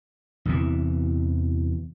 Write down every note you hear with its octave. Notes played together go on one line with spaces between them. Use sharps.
E2 C3 E3